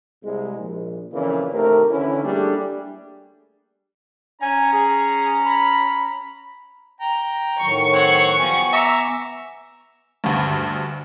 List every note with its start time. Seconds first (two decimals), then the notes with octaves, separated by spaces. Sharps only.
0.24 C2 G#3
0.58 A#1
1.13 F2 A#2 C#3 E3
1.53 D#2 C3 A3 A#4
1.90 D3 E3 C#4 E4
2.23 G3 A3 A#3 D4 G4 G#4
4.41 C#4 G#5 A#5
4.73 G#4
5.46 B5
7.01 G5 A#5
7.62 A2 D#3 F#3 C#6
7.93 C4 C#5 F#5
8.38 F3 G3 B3 G#5
8.73 E5 A#5 D6
10.24 D2 G2